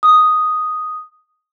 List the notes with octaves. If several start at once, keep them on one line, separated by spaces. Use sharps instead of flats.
D#6